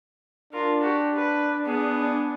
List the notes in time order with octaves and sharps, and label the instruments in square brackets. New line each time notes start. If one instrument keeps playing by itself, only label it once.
[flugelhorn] D4 [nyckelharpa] F4 A#4
[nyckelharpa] F#4 G4
B4
B3 G#4
[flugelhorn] D4